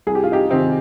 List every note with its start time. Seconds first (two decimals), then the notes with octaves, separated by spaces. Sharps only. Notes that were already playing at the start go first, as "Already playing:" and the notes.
0.07 C2 G#4
0.15 G4
0.24 F4
0.32 D#4 G4
0.50 C3 D#3 C4 D#4